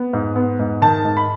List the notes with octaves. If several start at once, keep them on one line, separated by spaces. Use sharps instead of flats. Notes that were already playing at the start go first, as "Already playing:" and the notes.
Already playing: B3
G#2
B3
G#2
D#3 A5
G#2
B5